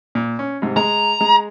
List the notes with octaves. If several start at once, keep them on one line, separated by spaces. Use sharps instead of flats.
A#2
C#4
G#2 C3
G#3 A#5
G#3